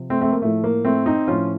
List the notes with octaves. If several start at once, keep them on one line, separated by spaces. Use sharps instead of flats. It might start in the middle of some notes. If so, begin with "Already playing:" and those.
Already playing: C3 F3
A3 C4
A3 C4
A#3
A2 F3 A3
A#3
A3 C4
C4 D#4
A2 F3 C#4 F4